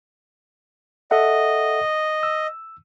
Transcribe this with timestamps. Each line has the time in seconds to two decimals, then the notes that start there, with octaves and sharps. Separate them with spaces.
1.11 A4 D#5 E5 F#5
2.23 E6